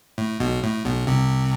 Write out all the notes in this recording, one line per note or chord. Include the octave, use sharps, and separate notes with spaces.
A2
B1 B2
A2
B1 B2
C2 C3